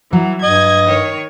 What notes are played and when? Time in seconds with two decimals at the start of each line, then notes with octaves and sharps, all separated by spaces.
0.13 E3 F#3
0.43 G2 D#5 G#6
0.86 D#3 C#5